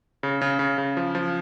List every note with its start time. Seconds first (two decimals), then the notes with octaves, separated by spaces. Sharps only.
0.23 C#3
0.41 C#3
0.59 C#3
0.78 C#3
0.97 F3
1.15 F3